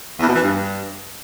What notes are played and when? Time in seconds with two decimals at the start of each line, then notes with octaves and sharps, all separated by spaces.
0.19 E2
0.27 B2
0.34 E3
0.42 G2